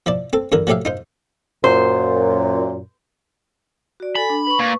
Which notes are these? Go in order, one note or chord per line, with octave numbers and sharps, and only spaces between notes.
F3 E4 D5
C4 A4
G2 D3 E3 A#4
F3 F#3 A3 G4 E5 F5
D#4 F4 C5
F#2 A#2 C5
F#4 D5
A4 G#5 B5
D4
B4 C#6
A#2